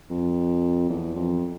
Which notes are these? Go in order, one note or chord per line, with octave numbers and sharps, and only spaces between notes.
F2
E2
F2